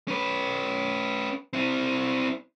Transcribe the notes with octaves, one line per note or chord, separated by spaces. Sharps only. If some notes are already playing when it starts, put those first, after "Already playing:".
C#4 B4
C4 E4